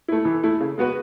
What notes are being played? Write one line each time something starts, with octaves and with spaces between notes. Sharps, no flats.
A3 E4
E3
A3 E4
C#3
G#3 B3 F#4 B4